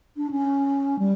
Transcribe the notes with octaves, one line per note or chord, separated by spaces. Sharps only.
D4
C#4
G3